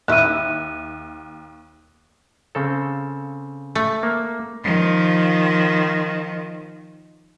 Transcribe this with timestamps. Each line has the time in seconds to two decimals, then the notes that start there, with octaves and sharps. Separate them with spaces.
0.08 D#2 D#3 E4 E6 F#6 D#7
2.55 C#3 C4 A4
3.75 A3
4.03 A#3
4.63 D#3 F3